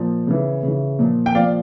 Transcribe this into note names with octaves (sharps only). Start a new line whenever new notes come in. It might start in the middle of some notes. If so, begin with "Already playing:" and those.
Already playing: A#2 F3
C#3 E3
C#3 E3
A#2 F3
G5
A#2 F3 D5 F5